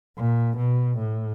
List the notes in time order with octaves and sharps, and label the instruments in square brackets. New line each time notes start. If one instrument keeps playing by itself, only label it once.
[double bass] A#2
B2
A2